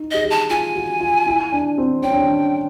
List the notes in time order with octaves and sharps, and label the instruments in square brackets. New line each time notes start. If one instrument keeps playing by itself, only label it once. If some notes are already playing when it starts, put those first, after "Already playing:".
Already playing: [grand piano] D#4
[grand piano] G#4 [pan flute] D#5
[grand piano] G4
[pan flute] A5
[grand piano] F4 [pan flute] G#5
[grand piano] F#4
F4
E4
D4
C4
[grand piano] C#4 [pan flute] G5
[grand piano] D4
C#4
D4